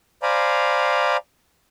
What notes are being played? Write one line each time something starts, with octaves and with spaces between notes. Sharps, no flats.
C5 D5 F5 G#5 A#5 B5